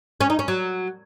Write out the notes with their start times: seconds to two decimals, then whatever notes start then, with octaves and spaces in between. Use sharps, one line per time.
0.21 C#4
0.30 D#4
0.39 C#4
0.48 F#3